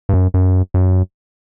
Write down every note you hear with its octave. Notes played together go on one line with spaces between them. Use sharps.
G2
F#2
F#2
F#2